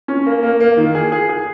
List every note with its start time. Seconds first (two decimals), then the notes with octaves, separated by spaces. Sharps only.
0.08 C#4
0.26 A#3
0.43 A#3
0.60 A#3
0.77 D#3
0.95 G#4
1.12 G#4
1.29 G#4